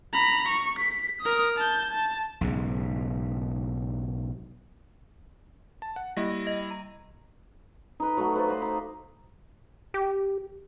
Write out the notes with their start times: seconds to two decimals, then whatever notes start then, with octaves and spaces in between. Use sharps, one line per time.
0.13 A#5 B5
0.49 C#6
0.79 B6
1.21 A#4 D#6
1.57 A5 G6
1.91 A5
2.41 B1 G#2 C#3
5.82 A5
5.96 F#5
6.17 G3 A#3 E4 A#6
6.47 D#5
6.71 A#5
8.00 D#4 B4
8.17 F#3 A3 D#4 F#5
8.35 B4 C5 D5 F5
8.48 C5 D#5 B5
8.62 D#4 F5
9.94 G4